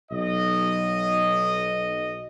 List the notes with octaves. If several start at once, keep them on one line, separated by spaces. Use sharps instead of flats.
B1 D#5